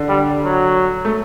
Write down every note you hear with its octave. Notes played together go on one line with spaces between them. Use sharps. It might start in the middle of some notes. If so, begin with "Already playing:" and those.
Already playing: D3
G3
F#3
A3